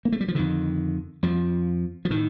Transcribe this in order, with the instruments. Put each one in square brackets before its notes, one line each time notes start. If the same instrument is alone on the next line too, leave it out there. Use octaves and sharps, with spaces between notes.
[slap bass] A#3
A3
G3
F3
F2 D3 D#3
F2 F3
F3
A2 D#3